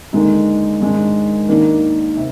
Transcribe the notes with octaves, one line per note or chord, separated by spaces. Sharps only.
D#2 D3 G#3 D#4
G#2 D#3 G#3 D4
D#2 D#3 A#3 D4
C3